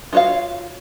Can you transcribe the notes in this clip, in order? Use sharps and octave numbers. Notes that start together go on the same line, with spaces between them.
F4 F#4 A#4 C#5 F5